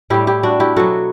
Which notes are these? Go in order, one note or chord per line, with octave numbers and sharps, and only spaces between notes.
A2 G3 E4 G4
E4 G4
D4 F#4
E4 G4
B2 F#3 F#4 A4